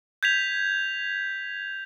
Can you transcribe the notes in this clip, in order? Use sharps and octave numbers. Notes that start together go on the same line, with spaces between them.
G6 G#6 B6 F7